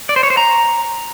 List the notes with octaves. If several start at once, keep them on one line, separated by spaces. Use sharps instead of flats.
D5
C5
C#5
C5
A#5